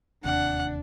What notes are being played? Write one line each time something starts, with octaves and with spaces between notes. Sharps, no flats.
E1 D#2 C3 D4 F#5